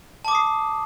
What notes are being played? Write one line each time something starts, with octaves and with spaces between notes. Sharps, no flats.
A5 D6 D#6 C7